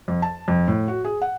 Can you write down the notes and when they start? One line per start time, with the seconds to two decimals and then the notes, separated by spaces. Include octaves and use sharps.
0.08 F2
0.22 A5
0.48 F2
0.68 A2
0.88 F#4
1.05 G#4
1.22 F#5